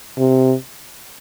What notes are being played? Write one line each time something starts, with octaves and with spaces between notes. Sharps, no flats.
C3